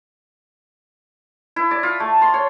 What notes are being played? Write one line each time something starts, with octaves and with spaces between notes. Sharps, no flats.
E4
D5
F4
A3
C6
C#5